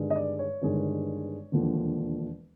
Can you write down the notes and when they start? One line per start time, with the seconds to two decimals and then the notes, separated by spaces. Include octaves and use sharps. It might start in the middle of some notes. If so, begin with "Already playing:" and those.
Already playing: G1 G2 D#3 G#3
0.10 D#5
0.16 D5
0.39 C#5
0.62 G1 G2 D#3 G#3
1.52 E1 D#2 D3 F3